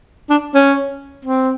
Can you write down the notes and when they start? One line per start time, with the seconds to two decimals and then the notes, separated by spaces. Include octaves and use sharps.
0.30 D4
0.55 C#4
1.25 C4